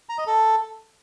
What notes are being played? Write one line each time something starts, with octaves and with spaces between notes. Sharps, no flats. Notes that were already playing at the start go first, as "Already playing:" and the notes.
A#5
D#5
A4